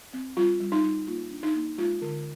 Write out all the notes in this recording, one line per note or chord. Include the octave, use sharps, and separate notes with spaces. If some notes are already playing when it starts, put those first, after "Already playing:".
C4
G3 F4
G3
D#4
G3
A#3 F4
D4
D#4
A#3
G#3 F4
D3